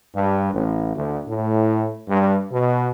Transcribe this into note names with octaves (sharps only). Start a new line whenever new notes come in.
G2
A1
D2
A2
G2
B2